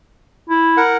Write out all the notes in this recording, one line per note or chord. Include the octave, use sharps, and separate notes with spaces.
E4
A#4 F#5